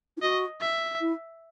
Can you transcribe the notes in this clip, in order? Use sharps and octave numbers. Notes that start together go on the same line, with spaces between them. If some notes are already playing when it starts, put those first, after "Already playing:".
E4
F#4 D#5
E5
E4